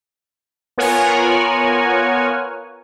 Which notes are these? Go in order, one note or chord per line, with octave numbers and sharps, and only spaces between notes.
B3 F4 A#4 C#5 F#5 G#5